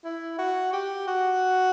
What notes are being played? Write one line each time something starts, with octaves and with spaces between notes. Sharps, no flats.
E4
F#4
G4
F#4